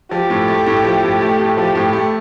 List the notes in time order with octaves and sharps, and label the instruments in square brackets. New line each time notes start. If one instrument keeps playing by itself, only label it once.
[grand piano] F3 [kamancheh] G4
[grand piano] A2
A3
A2
F3
A2
A3
A2
[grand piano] F3 [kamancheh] G4
[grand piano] A2
A3